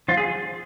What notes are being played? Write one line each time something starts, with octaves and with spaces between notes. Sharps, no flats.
F3 F4
G#4